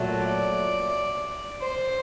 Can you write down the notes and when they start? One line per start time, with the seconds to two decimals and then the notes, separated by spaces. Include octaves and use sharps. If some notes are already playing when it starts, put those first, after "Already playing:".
Already playing: A#2 F#3 A3
0.27 D5
1.61 C5